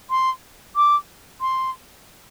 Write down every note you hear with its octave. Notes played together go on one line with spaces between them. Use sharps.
C6
D6
C6